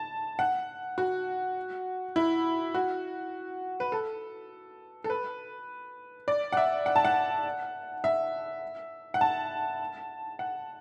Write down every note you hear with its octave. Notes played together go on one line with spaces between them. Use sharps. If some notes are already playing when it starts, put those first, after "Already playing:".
Already playing: A5
F#5
F#4
E4
F#4
B4
A4
A4
B4
D5
F#5
E5
F#5
A5
F#5
E5
F#5
A5
F#5